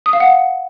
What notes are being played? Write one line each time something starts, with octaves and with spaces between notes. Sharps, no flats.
D#6
F5
F#5